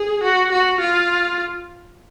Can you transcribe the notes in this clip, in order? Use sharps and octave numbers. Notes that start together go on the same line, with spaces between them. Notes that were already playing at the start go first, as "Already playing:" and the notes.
Already playing: G#4
F#4
F#4
F4